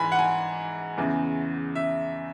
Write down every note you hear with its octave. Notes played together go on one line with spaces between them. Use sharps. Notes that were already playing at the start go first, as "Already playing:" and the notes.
Already playing: G#2 E3 G#5 B5
F#5
G#5
E2 C#3 E3
E5